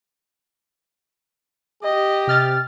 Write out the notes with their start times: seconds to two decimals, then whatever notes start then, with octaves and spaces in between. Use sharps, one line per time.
1.83 G4 D#5
2.27 C3 F6 A6